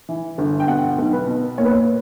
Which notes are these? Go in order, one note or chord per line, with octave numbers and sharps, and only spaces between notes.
E3
G1
G5
B2 F#5
B1
B4
B2
A#2 C#5
B4
C#5